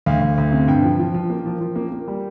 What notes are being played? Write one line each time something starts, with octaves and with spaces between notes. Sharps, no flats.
D2 F5
D2
D2
C3
G2 G5
F3
F3
F3
A#3
F3
F3
A#3
A#3
G3